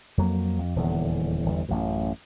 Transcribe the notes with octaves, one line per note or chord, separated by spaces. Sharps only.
F2 F#3 A#3
F2
D#1 E2 D3
G1 E2
A1 F#2